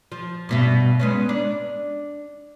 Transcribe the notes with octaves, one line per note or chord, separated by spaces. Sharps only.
F3
G2 B2 E5
G#3 B3 C#4
D4